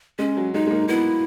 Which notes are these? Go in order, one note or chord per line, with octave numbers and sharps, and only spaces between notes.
G#3 C#4
F#3
G#3 D#4
G#3
A#3
B3 E4